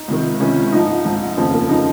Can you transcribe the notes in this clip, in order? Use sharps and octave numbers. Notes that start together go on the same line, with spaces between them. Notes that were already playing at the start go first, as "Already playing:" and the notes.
Already playing: D#4
C#2 C3 D#3
C#2 C3 D#3 C#4
A#1 G#2 F3 D#4
A#1 G#2 F3
F1 D#2 C#3 F3 C4
A#3
C#3 F3 D#4